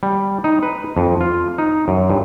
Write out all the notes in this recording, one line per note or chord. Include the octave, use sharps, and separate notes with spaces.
G3
D#4
B4
F2
F4
D#4
F#2
G2